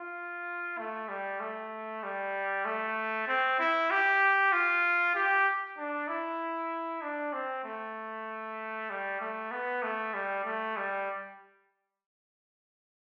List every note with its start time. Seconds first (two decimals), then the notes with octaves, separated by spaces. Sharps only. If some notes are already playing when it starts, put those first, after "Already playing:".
Already playing: F4
0.78 A3
1.09 G3
1.40 A3
2.03 G3
2.65 A3
3.28 C4
3.59 E4
3.91 G4
4.52 F4
5.15 G4
5.78 D4
6.08 E4
7.02 D4
7.33 C4
7.65 A3
8.90 G3
9.21 A3
9.51 B3
9.83 A3
10.14 G3
10.45 A3
10.77 G3